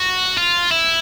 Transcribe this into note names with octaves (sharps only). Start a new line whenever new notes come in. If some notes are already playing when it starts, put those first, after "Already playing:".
Already playing: F#4
F4
E4